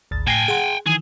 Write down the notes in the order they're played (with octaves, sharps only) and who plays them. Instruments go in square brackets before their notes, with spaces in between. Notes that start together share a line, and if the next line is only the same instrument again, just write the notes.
[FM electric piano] G#1 D2 A6
[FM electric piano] A2 A#6 C7 [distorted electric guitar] G5 G#5
[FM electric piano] G#4 F#5 C6
[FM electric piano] D#3 E3 [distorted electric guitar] G#4